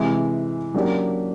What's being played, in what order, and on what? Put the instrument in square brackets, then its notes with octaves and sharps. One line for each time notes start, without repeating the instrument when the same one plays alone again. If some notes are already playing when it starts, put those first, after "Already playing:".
Already playing: [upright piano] C3 E3 G#3
C#3 F#3 A#3 D4 G4